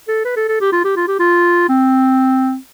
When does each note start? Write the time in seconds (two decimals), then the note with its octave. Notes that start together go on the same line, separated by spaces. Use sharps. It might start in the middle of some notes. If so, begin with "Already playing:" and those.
0.08 A4
0.25 B4
0.36 A4
0.48 A4
0.61 G4
0.72 F4
0.84 G4
0.96 F4
1.08 G4
1.19 F4
1.69 C4